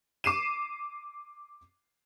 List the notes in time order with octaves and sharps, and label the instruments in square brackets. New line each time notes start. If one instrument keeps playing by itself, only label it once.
[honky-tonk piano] D6 C7 D#7 E7